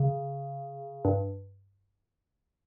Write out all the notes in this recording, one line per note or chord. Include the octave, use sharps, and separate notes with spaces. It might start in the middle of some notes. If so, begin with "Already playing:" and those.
Already playing: C#3
G2